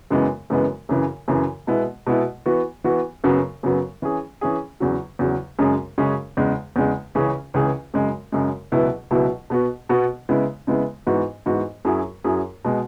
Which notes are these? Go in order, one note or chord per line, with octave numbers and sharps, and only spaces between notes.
F#2 C#3 E3 G#3 B3
F#2 C#3 E3 G#3 B3
F#2 C#3 E3
F#2 C#3 E3
B2 G#3 B3 E4
B2 G#3 B3 E4
E3 B3 F#4
E3 B3 F#4
F#2 C#3 F#3 B3
F#2 C#3 F#3 B3
E3 C#4 G#4
E3 C#4 G#4
E2 C#3 F#3
E2 C#3 F#3
F#2 C#3 G#3 C#4 G#4
F#2 C#3 G#3 C#4 G#4
E2 C#3 G#3
E2 C#3 G#3
C#2 C#3 E3 C#4 G#4
C#2 C#3 E3 C#4 G#4
F#2 C#3 G#3
F#2 C#3 G#3
C#2 B2 F#3 B3 E4
C#2 B2 F#3 B3 E4
B2 B3 F#4
B2 B3 F#4
C#3 G#3 B3 E4
C#3 G#3 B3 E4
G#2 E3 B3 F#4
G#2 E3 B3 F#4
F#2 F#3 E4 G#4
F#2 F#3 E4 G#4
B2 G#3